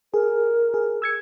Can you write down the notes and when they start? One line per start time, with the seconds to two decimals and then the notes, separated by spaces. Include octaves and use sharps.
0.14 G#4 A#4
0.74 G#4
1.02 E6 G#6 C#7